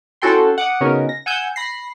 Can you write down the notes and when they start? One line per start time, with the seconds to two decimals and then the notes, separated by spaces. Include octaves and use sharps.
0.22 C#4 E4 F#4 A4 G5 C6
0.58 F#5 D6 D#6
0.80 C#3 B3 C#4 D#4 F#4 A#4
1.09 A#6
1.26 F#5 G#5 E6 G6
1.56 B5 A#6 C7